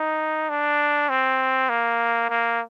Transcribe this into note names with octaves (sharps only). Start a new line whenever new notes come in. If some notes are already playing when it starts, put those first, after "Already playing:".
Already playing: D#4
D4
C4
A#3
A#3